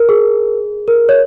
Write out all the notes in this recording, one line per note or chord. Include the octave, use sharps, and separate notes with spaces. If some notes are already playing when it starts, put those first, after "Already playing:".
Already playing: A#4
G#4
A#4
C#5